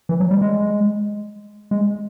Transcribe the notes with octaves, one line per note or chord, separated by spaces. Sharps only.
E3
F#3
G3
G#3
G#3